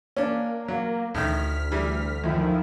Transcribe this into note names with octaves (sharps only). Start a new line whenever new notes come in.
A#3 C#4 D4
F#3
D2 A2 D#3 F6 B6
E3 G3
F#2 D#3 F3 E4